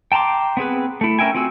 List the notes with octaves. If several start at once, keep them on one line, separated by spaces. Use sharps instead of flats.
G5 A5 A#5 C6 D6
B3 C4 G#4 B4
A3 E4
C#4 A#4 E5 G5 G#5
C4 F4 F#4 G#5 E6